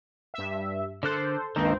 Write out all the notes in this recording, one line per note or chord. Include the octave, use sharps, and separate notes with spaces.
G2 E5
D3 A4 A#4 C5 F#6
C#2 G2 D#3 A#3 C4 C#4 D#4 C5